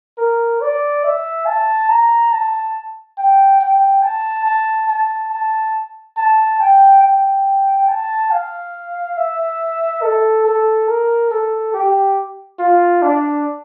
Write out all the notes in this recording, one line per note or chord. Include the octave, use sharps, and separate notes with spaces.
A#4
D5
E5
A5
A#5
A5
G5
G5
A5
A5
A5
A5
A5
G5
G5
A5
F5
E5
A4
A4
A#4
A4
G4
F4
D4